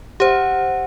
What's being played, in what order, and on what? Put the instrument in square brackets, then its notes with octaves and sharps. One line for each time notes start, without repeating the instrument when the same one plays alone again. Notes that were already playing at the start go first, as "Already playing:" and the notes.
[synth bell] G4 C5 [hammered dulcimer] E5 F#5